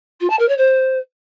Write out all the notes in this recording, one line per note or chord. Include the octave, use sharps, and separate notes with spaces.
F4
A5
A#4
C#5
C5